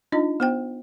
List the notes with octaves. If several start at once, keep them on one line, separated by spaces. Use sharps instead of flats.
D4 D#4 F4 D#5
B3 C5 G5